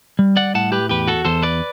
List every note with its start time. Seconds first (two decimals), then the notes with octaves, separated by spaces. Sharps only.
0.19 G3
0.37 D5 F#5
0.54 A2 F#5 A5
0.72 G4 B4
0.89 E2 G4 B4
1.08 F#4 A4
1.25 E2 A4 C5
1.43 B4 D5